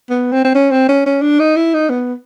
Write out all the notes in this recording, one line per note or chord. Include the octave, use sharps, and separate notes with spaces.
B3
C4
C4
C#4
C4
C#4
C#4
D4
D#4
E4
D#4
B3